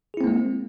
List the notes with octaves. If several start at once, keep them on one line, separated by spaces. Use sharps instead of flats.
G#3 A#3 C4 E4 G#4